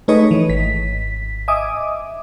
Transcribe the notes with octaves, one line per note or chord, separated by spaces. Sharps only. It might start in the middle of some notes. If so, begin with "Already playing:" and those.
A3 D#4 G#4 B4 C#5 D#5
E3
G#1 B6
D#5 E5 G#5 D6 D#6